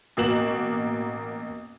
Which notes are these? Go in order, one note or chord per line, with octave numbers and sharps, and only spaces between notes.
A1 B2 A#3 F#4 E7 F#7